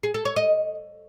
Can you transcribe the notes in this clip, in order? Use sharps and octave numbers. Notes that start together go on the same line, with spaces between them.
G#4
A4
C#5
D#5